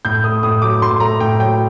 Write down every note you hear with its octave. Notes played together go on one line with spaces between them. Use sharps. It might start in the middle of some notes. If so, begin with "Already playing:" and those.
A2 G6
A3 D#6
A2 D#6
F#3 D6
A2 C6
A3 A#5
A2 G5
F#3 G5